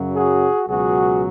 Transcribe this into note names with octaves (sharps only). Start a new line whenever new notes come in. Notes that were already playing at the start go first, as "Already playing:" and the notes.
Already playing: F#2 C#3 F#3
F#4 G#4
C#2 B2 F#3 F#4 G#4